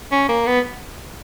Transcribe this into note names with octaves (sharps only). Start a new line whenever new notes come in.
C#4
A#3
B3